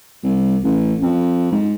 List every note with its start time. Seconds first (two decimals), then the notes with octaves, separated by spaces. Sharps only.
0.23 C2
0.63 A1
1.02 F2
1.52 G#2